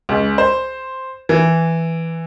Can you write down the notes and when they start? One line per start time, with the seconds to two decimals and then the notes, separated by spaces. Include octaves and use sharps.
0.09 C#2
0.38 C5
1.29 E3